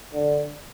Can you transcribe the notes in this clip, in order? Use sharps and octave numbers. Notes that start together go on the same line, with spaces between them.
D3